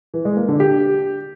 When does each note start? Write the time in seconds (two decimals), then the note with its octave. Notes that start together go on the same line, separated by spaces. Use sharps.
0.14 E3
0.25 G#3
0.37 A#3
0.48 D3
0.60 G4